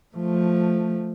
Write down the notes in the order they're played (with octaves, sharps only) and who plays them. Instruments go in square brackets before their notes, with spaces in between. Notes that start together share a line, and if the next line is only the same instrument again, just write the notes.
[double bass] F3 A3